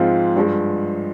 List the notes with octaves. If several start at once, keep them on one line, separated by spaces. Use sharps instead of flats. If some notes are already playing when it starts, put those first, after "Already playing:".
Already playing: G#2 F3 G#3 C4 F4
G2 F3 G#3